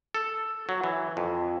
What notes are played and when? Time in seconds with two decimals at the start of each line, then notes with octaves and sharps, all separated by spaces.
0.14 A4
0.69 F#3
0.84 E3
1.17 F2